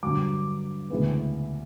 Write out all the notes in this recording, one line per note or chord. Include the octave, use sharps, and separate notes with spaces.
G2 D3 F#3 D6
D2 C#3 E3 G#3 B3